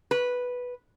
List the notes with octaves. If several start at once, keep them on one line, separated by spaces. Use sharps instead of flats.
B4